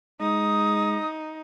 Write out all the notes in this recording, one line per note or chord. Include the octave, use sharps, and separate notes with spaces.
G#3 D#4 D#6